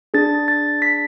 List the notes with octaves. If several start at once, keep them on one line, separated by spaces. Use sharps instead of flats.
D4 G#4 A6
A6
B6